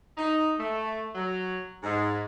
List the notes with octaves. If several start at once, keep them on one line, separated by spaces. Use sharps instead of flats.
D#4
A3
F#3
G#2